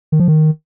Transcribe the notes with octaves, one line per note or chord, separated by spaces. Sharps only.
D#3
F3
D#3